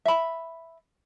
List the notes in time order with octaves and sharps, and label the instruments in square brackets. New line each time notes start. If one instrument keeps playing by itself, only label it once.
[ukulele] E5 B5